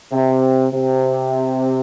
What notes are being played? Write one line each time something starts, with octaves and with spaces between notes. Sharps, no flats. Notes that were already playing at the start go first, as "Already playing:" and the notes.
C3
C3